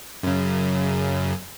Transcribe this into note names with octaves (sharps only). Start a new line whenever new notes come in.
F#2 C#3